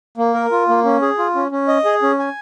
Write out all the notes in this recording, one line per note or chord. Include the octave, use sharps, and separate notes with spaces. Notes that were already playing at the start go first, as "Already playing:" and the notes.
A#3
A#4
F4
A#3
C#4
G#4
F4
C#4
C#4
D#5
G#4
C#4
G#5